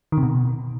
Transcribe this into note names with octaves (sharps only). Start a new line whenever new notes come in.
D#3
C3
B2